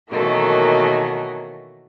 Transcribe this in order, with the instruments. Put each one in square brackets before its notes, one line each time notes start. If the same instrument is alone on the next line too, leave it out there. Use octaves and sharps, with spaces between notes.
[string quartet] B2 D#3 E3 F#3 A3 A#3